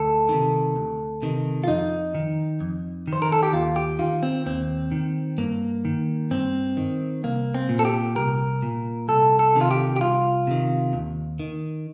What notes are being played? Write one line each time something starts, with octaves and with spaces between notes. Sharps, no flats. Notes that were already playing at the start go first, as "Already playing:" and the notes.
Already playing: D2 A4
C3 D#3
D2
C3 D#3
F4
F2 D#4
D#3
F2
D#3
C5
A#4
A4
G4
D#2 F4
G4
D#3 F4
C4
D#2 C4
D#3
G2 A#3
D#3
G2 C4
D#3
C2 A#3
C4
A#2
A4
G4
C2 A#4
A#2
C2 A4
A4
C3 D#3
F4
G4
G4
C2 F4
C3 D#3
D#2
D#3